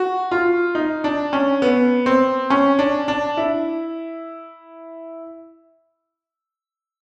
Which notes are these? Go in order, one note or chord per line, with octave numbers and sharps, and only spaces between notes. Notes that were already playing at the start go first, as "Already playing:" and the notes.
Already playing: F#4
F4
D#4
D4
C#4
B3
C4
C#4
D4
D4
E4